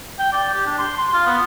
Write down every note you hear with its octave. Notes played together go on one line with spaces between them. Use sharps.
G5
D5
G4
D4
C6
C6
F4
B3